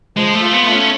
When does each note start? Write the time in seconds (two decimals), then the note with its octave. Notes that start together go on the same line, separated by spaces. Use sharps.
0.17 F3 G#3
0.35 A3
0.41 F4
0.53 B3
0.65 A3
0.72 C#4